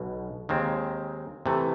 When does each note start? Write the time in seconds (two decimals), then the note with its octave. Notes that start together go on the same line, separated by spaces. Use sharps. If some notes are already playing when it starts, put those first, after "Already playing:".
Already playing: B1 B2
0.49 D#2 D#3 G#3 C4
1.46 C3 E3 A3